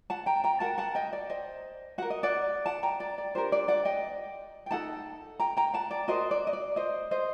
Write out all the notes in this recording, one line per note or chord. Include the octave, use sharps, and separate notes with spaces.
F#5 A5
G5 A#5
G5 A#5
F#4 A#4 F#5 A5
F#5 A5
D#5 G5
D5
C5 D#5
F#4 A#4 F#5
D#5
D5 F#5
F#5 A5
G5 A#5
D5
D5
D4 G4 A#4 C5
D5
D5 F#5
D#5 G5
G5
D#4 A4 F#5 A5
G5 A#5
G5 A#5
F#5 A5
D5
F#4 A#4 C5 D#5
D5
D#5
D5
C5 D#5
C5 D#5